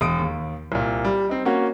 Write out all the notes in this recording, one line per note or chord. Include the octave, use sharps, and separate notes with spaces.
E1 D#6 D7
D#2
C2 A#2
G3
C4 D#4
A#3 C#4 F#4